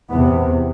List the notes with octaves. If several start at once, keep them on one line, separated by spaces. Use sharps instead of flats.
E2 C3 B3